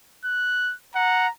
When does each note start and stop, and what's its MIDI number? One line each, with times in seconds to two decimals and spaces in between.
0.25 0.74 90
0.95 1.27 78
0.95 1.30 82